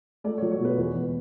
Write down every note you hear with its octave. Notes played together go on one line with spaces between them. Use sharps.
A3 D5
C#5
F#3
C#5
B2 B4
E2 B4
E2